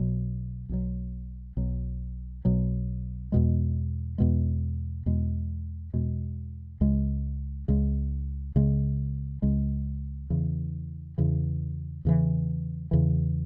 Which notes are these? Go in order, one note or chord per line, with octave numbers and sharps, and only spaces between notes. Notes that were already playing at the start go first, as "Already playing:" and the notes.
Already playing: B1 B2 F#3
B1 B2 F#3
B1 B2 F#3
B1 B2 F#3
E2 B2 G#3
E2 B2 G#3
E2 B2 G#3
E2 B2 G#3
C#2 C#3 G#3
C#2 C#3 G#3
C#2 C#3 G#3
C#2 C#3 G#3
E2 C#3 E3
E2 C#3 E3
E2 C#3 E3
E2 C#3 E3